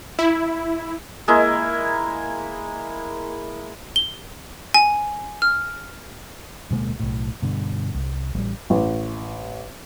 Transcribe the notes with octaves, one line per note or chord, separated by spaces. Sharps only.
E4
G#3 A#3 E4
G7
G#5
F6
D1 B2 G#3 A#3
B1 A2
G2 B2 D3
C2
A1 G3
A1